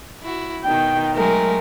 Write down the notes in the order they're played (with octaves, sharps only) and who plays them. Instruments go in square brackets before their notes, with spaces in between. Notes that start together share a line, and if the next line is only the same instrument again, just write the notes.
[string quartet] E4 F#4
[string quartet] B2 D#3 [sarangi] G5
[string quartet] F#3 G#3 A3 [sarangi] A#4